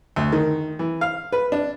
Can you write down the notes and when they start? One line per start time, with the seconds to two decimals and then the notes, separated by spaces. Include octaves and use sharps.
0.16 D2
0.33 D#3
0.79 E3
1.01 F5
1.32 B4
1.52 D4